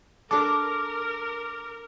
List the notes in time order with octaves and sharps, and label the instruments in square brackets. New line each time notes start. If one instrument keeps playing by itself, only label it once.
[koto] D4 A4 [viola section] A#4 [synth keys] D6